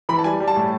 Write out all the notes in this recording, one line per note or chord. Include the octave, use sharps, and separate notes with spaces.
E3 B5
A5
G3 G#5
G3
A5
A2